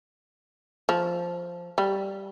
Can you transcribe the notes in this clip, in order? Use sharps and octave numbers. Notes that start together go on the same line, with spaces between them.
F3
G3